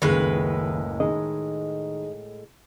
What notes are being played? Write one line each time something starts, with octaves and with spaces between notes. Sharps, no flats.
F#1 C#2 A2 D#3 G#3 B4
D#3 G#4 D#5